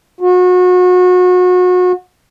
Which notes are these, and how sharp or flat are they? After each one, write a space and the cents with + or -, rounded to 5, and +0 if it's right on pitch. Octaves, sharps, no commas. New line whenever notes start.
F#4 -30